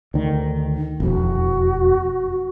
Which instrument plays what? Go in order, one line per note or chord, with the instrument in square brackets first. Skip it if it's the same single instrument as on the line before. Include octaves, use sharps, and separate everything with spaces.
[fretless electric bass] D2 D#3
[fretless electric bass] E1 F2 [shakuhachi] F#4